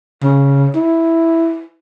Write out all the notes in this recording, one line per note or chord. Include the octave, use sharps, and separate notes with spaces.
C#3
E4